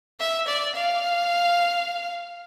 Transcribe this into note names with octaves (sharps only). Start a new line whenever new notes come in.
E5
D5
F5